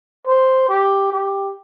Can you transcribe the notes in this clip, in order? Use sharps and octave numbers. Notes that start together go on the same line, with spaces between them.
C5
G4
G4